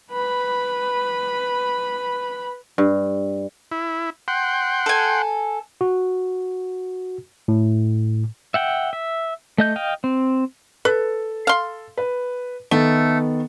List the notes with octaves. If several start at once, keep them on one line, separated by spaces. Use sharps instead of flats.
B4 B5
G2
E4
F#5 G5 C6
A4 G#5
F#4
A2
E5 F#5 G5
E5
A3 D#5 G6
D#5 F5 G5
C4
A4 B4
F5 C6
B4
D#3 A3 B3 A4